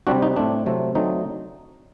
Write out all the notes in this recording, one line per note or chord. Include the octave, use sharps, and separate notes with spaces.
C3 G3 C4 D4 F#4
D#4
A2 A3 C4 D4
C3 F#3 A3 C4
D3 F#3 A3 C4 D#4